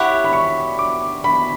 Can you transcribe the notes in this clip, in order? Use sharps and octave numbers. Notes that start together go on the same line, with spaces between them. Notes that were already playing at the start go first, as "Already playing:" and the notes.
Already playing: E4 G4 C#5 F#5 B5
B5
C#6
D6
B5